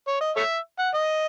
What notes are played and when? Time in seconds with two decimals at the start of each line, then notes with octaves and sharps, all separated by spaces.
0.07 C#5
0.21 D#5
0.36 A4 C#5 E5
0.79 F#5
0.94 D#5